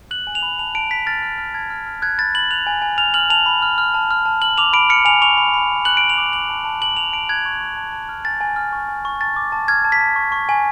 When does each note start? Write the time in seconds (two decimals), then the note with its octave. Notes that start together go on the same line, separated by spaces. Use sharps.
0.11 F#6 F#7
0.27 G#5
0.35 F7
0.43 B5
0.59 A5 F7
0.75 A5 D7
0.91 A5 B6
1.07 F6 A6
1.23 F6
1.38 F6
1.54 A5 G#6
1.70 F6
1.86 F6
2.02 F#6 G#6
2.18 B5 A6
2.34 B5 F#7
2.51 F#6 F7
2.67 G#5
2.82 G#5
2.98 F6 F7
3.14 F6 F#7
3.30 A5 F7
3.46 B5
3.62 F6
3.78 F6
3.94 A5
4.11 F6
4.25 A5
4.42 F6 F#7
4.58 D6 F7
4.73 B5 D7
4.89 F6 C#7
5.05 G#5 F7
5.22 C#6 F7
5.37 B5
5.54 B5
5.70 B5
5.85 F#6 F#7
5.97 F#6 D7
6.10 F7
6.18 D6
6.33 D6 F#7
6.49 A5
6.65 A5
6.81 A5 F#7
6.97 A5 F7
7.12 A5 D7
7.29 F#6 G#6
7.46 C#6
7.60 C#6
7.77 A5
7.92 A5
8.09 F6
8.25 G#5 A6
8.41 G#5
8.56 F6
8.73 C#6
8.89 G#5
9.05 C#6
9.21 A5 A6
9.36 D6
9.52 A5
9.68 F6 G#6
9.84 A5
9.92 B6
10.00 A5
10.16 C#6
10.32 C#6
10.49 G#5